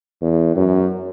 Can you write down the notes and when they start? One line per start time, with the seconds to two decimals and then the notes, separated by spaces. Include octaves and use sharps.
0.22 E2
0.56 F#2